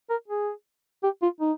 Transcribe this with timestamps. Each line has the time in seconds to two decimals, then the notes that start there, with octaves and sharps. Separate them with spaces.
0.10 A#4
0.28 G#4
1.03 G4
1.22 F4
1.41 D#4